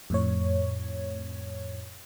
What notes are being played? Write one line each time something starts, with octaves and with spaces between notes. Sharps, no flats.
F2 A2 C#5